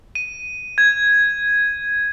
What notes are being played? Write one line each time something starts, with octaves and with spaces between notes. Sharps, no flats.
D#7
G#6